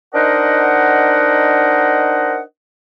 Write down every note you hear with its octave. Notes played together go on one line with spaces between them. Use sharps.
D4 D#4 A#4 C5 D#5 F#5